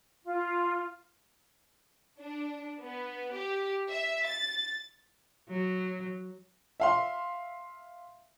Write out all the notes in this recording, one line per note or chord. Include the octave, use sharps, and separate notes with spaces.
F4
D4
B3
G4
E5
A6
F#3
E5 F5 C6